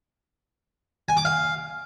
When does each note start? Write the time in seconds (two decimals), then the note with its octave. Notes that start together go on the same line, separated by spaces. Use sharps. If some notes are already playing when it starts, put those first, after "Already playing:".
1.09 G#5
1.17 D6
1.25 F5